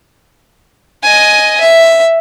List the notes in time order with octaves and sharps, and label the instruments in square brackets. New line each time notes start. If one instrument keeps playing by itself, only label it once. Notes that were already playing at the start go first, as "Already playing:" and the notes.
[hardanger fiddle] D#5 G#5
E5